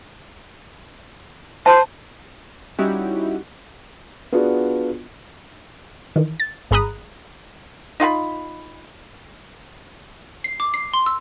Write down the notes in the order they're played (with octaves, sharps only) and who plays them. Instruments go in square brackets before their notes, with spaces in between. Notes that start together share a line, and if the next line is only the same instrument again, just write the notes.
[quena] C5 [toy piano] A5
[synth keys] G3 C#4 D#4 E4 F#4 G4
[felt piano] B3 D4 F4 F#4 G#4
[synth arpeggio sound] D#3 E3
A6
G#1 G#4 A#5 B5 D#6 F#6
[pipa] D#4 F4 F#5 B5
[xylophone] C7
D6
C7
C6
E6